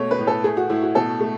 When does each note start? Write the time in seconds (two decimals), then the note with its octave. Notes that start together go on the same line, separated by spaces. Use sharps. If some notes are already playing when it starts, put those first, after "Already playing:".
Already playing: B2 A3 C#5
0.11 B4
0.19 A2
0.27 A4
0.44 A3 G#4
0.57 F#4
0.69 A2 E4
0.83 F#4
0.95 B2 A4
1.21 A3